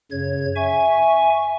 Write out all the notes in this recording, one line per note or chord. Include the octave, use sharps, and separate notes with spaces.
F#2 C#3 C#5 G#6
E5 G#5 C#6